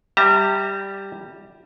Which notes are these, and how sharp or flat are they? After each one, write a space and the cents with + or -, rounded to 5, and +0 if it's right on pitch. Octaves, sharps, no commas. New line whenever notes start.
G3 +0 E5 -25 A#5 -40